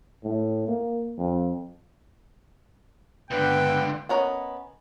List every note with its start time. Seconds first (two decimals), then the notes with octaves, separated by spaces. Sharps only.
0.24 A2
0.68 A#3
1.18 F2
3.31 C#2 G2 D3 B3 B4 G5
4.09 B3 C#4 A#4 D#5